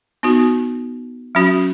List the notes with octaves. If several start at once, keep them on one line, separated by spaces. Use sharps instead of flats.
B3 D#4 F#4
F#3 C#4 F#4